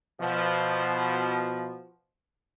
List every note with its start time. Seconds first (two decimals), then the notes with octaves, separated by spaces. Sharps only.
0.21 B2 F3